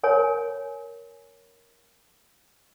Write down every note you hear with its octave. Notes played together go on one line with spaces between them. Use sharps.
A#4 C#5 G#5